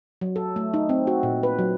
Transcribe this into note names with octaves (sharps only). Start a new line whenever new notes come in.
F#3
A4
A3
D#4
C4
F#4
A#2
B4
F#3